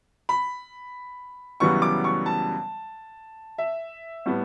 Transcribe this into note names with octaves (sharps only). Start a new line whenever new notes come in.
B5
F#2 C#3 E3 G3 B3 C#6
D6
C#6
A5
E5
A2 G3 B3